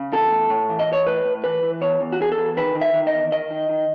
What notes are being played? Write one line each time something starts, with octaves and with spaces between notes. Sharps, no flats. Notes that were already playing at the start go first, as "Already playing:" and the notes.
Already playing: C#3
E2 A4
A2
A2
E3
D#5
E3
C#5
A2 B4
A2
E3 B4
E3
E2 C#5
E2
F#4
E2 G#4
A4
E2
D#3 B4
D#3
E5
D#3
D#5
E2
D#3 D#5
D#3
D#3